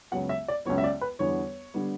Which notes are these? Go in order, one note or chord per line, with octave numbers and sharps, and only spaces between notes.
C#2 C#3 F#3 B3 F#5
E5
D5
C#2 C#3 F#3 B3 C#5
E5
D5
B4
E2 D3 G3 B3 C#5
D3 G3 B3